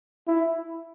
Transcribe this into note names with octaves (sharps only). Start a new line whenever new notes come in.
E4